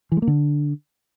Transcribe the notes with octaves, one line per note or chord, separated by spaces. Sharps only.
E3
G#3
A#3
D3